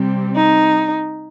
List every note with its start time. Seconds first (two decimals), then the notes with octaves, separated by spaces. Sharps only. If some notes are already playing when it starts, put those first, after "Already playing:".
Already playing: C3 G3 C4
0.36 D#4